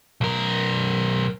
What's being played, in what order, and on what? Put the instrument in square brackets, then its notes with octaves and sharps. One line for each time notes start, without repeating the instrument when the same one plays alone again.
[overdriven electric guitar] B1 A#4